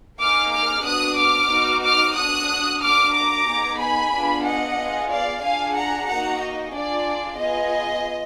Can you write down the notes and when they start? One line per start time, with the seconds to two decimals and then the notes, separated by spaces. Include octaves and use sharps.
0.20 A#3 D#4 G#4 D6 F6
0.52 D6 F6
0.85 B3 D4 F#4 D#6 F#6
1.18 D6 F6
1.50 B3 D#4 F#4
1.84 D6 F6
2.16 D4 F#4 D#6 F#6
2.81 A#3 D4 F#4 D6 F6
3.14 A#5 D6
3.46 B3 D#4 G#4
3.79 G#5 B5
4.12 B3 D4 F4 G#4
4.45 D#5 F#5
4.77 B3 F4 G#4
5.10 D5 F5
5.42 D4 F4 G#4 F5 G#5
5.75 F#5 A#5
6.08 A#3 D#4 F#4 F#5 A#5
6.41 D#5
6.73 D4 F4 G#4 D5
7.39 B3 F4 G#4 D#5